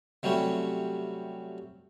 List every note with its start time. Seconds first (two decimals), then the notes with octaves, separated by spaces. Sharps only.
0.23 C3 F#3 G3 A3 C#4